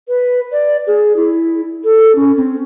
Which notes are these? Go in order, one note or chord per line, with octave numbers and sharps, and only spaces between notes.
B4
D5
G#4
E4
A4
C#4
C4